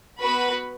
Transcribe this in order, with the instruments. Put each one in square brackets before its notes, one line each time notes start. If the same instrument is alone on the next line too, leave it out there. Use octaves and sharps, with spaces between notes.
[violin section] B3 F#4 B4 B5